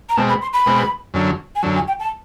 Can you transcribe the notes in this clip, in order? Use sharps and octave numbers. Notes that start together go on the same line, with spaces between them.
A#5
B2 G#3 C4 A5
B5
C6
B5
B2 G#3 C4
F#2 D3 F#3
G#5
F#2 D3 F#3 A5
G#5
G5
A5